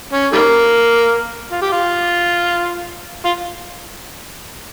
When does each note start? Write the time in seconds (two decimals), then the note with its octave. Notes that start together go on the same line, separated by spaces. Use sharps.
0.13 C#4
0.33 D#3 G3 A#3
1.52 F4
1.62 G4
1.72 F4
3.25 F4